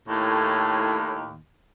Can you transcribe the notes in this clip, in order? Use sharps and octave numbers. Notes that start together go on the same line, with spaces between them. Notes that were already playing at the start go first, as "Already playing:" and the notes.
D#2 A2